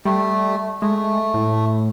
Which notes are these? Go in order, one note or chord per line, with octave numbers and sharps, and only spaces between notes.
G3 A3
G#3 A3
A2